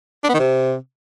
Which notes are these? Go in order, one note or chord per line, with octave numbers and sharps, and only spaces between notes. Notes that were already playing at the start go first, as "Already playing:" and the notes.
D4
B3
D#3
C3